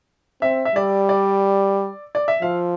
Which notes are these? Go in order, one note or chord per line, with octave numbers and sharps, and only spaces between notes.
C4 E5
E5
G3 D5
D5
D5
E5
F3 F5